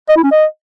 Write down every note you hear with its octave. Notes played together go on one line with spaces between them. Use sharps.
D#5
E4
C#4
D#5